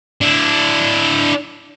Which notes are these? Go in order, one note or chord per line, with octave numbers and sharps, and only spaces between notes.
D4 E4